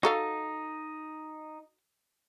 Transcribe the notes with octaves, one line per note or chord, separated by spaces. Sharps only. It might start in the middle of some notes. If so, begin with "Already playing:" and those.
D#4 F#4 A4 F5